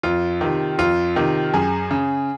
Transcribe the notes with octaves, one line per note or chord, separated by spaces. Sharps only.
F2 F4
C3 D#3
F2 F4
C3 D#3
F#2 G#4
C#3